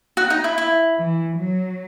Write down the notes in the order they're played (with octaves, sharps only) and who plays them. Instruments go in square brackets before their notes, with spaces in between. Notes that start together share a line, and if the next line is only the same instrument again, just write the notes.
[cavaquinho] F#4
D#4
E4
E4
[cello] E3
F#3